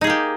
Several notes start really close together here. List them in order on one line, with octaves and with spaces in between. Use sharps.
D#4 G#4 A#3 G4